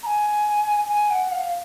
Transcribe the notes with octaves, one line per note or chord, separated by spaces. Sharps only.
A#5
G#5
G#5
F#5
F5